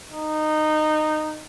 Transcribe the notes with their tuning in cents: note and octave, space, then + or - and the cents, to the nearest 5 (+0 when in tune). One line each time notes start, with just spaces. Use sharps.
D#4 -15